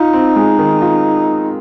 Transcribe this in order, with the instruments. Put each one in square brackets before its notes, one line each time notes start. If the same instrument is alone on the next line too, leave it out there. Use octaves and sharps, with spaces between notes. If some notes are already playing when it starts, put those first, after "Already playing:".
Already playing: [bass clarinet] D#4 [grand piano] F4
[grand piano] C4
G#3
D#3
F4